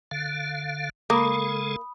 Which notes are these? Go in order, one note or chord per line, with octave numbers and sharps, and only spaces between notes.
D3 F5
C#3 G#3 A#3 A4 B5 D#6